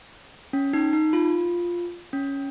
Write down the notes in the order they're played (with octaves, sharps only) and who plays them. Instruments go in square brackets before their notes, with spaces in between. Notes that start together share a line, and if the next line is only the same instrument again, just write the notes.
[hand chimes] C#4
D#4
D#4
F4
C#4